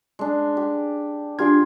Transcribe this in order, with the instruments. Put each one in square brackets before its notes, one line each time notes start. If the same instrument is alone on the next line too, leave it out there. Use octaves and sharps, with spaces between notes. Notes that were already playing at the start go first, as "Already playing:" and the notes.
[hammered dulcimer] G#3 D4
G4
[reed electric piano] D4 G4 G#6 [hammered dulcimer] F4 G#4 G5